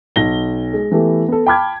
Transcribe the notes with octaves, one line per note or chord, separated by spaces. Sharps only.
B1 A#6 G7
G#3
E3 A3 B3 G4 A4
B3 A4
G5 A5 B5 D6 F6 G#6